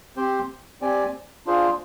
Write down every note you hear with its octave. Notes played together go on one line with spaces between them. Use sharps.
C4 G4 C5
C4 G4 D5 G#5
D4 F4 G#4 C5